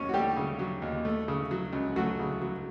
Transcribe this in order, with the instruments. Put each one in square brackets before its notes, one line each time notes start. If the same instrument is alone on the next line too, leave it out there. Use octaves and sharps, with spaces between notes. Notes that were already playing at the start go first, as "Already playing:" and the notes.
Already playing: [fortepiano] D#2 F#3 C#4 C#5
F#4
G3 A3 G4
C#3
F#3
D#2
A3
C#3
F#3
C#2
F#3 A3 F#4
C#3
F#3